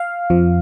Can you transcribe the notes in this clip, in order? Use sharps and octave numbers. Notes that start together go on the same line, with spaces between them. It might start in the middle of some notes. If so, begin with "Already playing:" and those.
Already playing: F5
F2 F3